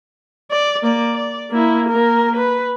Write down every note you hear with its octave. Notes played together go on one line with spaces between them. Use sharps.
D5
A#3 D5
D5
A#3 E4
A#3 A#4
B4